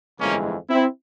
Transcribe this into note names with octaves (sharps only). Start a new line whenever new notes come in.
G1 F2 E3 G#3 A#3 C#4
C4 E4